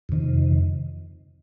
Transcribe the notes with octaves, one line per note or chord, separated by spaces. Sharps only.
F2 C3 D#3